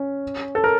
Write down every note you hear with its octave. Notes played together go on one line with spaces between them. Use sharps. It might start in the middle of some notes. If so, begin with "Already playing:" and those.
Already playing: C#4
A4
A#4